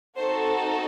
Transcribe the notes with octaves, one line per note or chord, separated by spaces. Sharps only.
C4 D#4 F#4 A4 C5